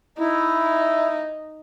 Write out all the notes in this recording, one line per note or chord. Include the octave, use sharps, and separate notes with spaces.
D#4 E4